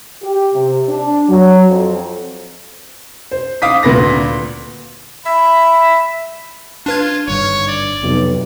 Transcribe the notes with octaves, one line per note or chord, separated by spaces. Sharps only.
G4
C3
D4
F#3
F2
C5
F5 D6 D#6 B6
D2 A#2 B4 A#6
E5 B5
D4 F4 B4 G#6
G#1 G2 D3 C#5
D5
B1 F2 C3